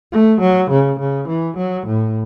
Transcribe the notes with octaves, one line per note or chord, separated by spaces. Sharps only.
A3
F#3
C#3
C#3
E3
F#3
A2